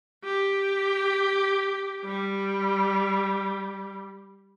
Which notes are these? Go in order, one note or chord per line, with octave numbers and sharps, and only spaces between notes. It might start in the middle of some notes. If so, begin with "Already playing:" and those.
G4
G3